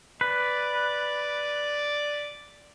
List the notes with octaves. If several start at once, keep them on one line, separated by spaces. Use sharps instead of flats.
B4 D5